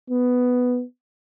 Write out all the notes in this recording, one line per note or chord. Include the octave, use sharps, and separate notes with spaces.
B3